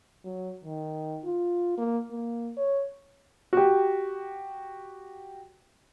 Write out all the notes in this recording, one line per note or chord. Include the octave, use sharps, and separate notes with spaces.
F#3
D#3
F4
A#3
A#3
C#5
F#4 G4